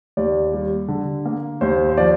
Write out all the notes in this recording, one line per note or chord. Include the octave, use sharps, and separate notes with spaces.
D#2 D5
G3
D3
A#3
D#2 C5
C5
F3 D5